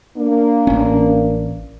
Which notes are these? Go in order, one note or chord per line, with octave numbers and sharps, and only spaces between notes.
A#3 D4
A1 C#4